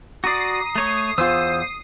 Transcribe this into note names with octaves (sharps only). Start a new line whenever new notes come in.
F#4 D5 A#5 D#6 C7
A3 C#5
E2 F4 C5 E6